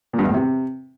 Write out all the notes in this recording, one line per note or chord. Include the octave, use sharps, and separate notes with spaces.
A#2
G2
E2
A2
C3